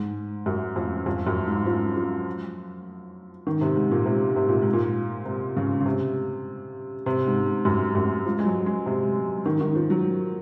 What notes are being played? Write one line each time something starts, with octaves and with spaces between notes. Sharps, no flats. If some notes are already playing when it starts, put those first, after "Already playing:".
Already playing: G#2
F#2
F2
F2
F#2
G#2
F3
F3
D#3
C3
G#2
A#2
C3
C3
A#2
G#2
A#2
C3
C#3
C#3
C3
C3
G#2
G#2
F#2
F#2
F3
G#3
F#3
G#3
C3
D#3
D#3
F3
F#3